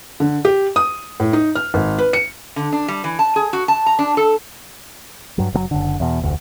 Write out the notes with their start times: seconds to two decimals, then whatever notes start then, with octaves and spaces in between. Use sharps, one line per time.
0.20 D3
0.45 G4
0.76 D#6
1.20 A2
1.33 D#4
1.55 F6
1.74 G#1
1.99 B4
2.13 C#7
2.56 D3
2.73 D4
2.88 G3
3.04 E3
3.19 A5
3.36 G#4
3.53 F#4
3.68 A5
3.86 A#5
3.99 D4
4.17 A4
5.38 G2 F#3
5.53 F#1 B2 F#3
5.71 F#1 D3
6.00 E2 B2
6.22 F1 D2